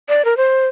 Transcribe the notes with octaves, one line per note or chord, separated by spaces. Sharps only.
D5
A#4
C5